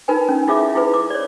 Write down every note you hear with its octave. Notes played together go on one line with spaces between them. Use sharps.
D#4 F4 A#4 B4 G#5
C#4
E4 F4 G#4 E5 F5 D6
E4 F4 G#4 B4
D6
C#5 D5